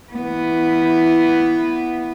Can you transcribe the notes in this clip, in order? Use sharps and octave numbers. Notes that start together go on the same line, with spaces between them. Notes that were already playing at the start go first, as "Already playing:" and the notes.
E3 B3